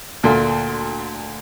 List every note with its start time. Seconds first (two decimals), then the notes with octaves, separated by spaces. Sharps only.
0.23 D2 A#2 A3